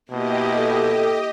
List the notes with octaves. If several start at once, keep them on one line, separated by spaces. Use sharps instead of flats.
B2 A#3 E4 G4 D#5
A4